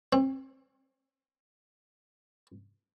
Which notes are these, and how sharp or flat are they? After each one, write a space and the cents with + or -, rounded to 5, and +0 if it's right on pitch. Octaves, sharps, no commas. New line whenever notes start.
C4 +35